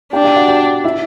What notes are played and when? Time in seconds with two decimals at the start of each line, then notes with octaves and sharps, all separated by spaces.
0.13 D4 G4 G5
0.24 G4 G5
0.36 F#4 F#5
0.48 G4 G5
0.84 E4 E5